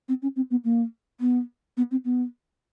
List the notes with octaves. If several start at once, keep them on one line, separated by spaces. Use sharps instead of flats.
C4
C#4
C4
B3
A#3
B3
B3
C4
B3